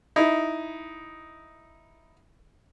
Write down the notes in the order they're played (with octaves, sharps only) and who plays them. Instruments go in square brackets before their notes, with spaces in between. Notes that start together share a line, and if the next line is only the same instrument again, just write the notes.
[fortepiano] D#4 E4